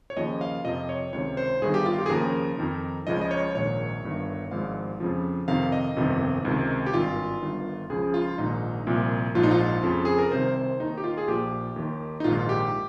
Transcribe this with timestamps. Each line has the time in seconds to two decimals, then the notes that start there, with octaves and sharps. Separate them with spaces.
0.10 C#5
0.17 D#2 C#3 F3 D#5
0.41 F5
0.64 F2 C3 F3 D#5
0.89 C#5
1.13 C#2 C3 D#3 C#5
1.37 C5
1.61 G1 G2 D#3 G#4
1.74 G4
1.86 F4
1.98 G4
2.06 G#4
2.10 D#2 C#3 F3 A#4
2.58 F2 D#3
3.07 C#2 C#3 F3 D#5
3.21 D#5
3.31 C#5
3.55 A#1 G#2 D#3 C#5
4.03 G1 G2 D#3
4.51 G#1 G#2 F3 F5
5.00 F2 C#3 F3
5.48 F2 C3 D#3 F5
5.72 D#5
5.96 G1 F2 C3 D#3
6.45 C#2 C3 D#3
6.86 G4
6.94 G#1 G2 D#3 F4
7.42 G1 G2 D#3
7.90 C#2 C#3 F3 G#4
8.14 F4
8.38 A#1 G#2 D#3 D#4
8.87 C2 A#2 F3
9.35 A#1 G#2 F3 F4
9.43 D#4
9.51 F4
9.83 F2 C#3 F3
10.05 G#4
10.19 A#4
10.31 C2 C3 D#3 C5
10.56 C5
10.80 D#2 D#3 D#4
10.97 G4
11.04 F4
11.17 G#4
11.28 A#1 A#2 F3 G4
11.76 D#2 D#3
12.20 D#4
12.24 A#1 G#2 D#3 F4
12.49 G4